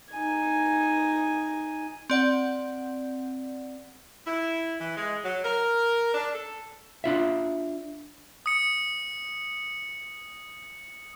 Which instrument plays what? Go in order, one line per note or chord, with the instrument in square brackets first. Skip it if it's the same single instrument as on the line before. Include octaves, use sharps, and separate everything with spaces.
[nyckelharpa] D#4 G#5
[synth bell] C4 D5 F#5
[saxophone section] E4
E3
G#3
F#3
A#4
D4
A4
[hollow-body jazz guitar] D4 F4 E5
[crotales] D#6 C#7